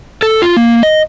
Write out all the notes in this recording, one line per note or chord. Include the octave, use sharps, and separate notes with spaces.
A4
F4
A#3
D#5